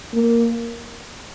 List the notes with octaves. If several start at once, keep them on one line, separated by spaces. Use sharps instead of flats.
A#3